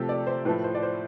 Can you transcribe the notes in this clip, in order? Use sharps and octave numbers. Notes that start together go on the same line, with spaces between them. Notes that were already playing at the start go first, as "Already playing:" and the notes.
Already playing: C3 F3 A3 G4 A4
D5
C5
A2 F3 A3 B4
C5
D5
C5